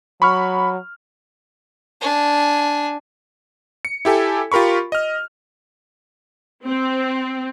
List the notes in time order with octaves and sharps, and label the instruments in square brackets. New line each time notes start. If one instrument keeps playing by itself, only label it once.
[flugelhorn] F#3 [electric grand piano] B5 C#6 F6
[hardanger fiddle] D4 G#5
[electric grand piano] C#7
E4 G4 A4 G#5
F4 G4 A#4 B5 C#6
D#5 F6
[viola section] C4